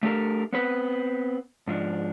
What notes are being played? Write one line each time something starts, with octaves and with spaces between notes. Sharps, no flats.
A3 D4 G4 A4 A#4
B3 C4 B4
G#2 F3 D4